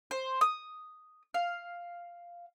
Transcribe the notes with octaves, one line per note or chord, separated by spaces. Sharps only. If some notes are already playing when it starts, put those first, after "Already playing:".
C5
D#6
F5